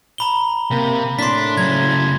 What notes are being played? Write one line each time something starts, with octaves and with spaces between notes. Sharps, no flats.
A#5 B5 G7
C3 A#3
A2 D4 C6 B6
C#3 F#3 G#6